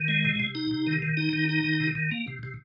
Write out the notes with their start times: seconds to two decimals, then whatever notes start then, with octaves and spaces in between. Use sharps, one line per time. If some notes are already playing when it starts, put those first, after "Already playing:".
Already playing: D#3
0.08 G#3
0.25 C3
0.40 C3
0.55 D#4
0.71 C3
0.87 D#3
1.02 D#3
1.17 D#4
1.33 D#3
1.49 D#4
1.64 D#3
1.80 C3
1.95 D#3
2.11 A#3
2.28 C3
2.43 C3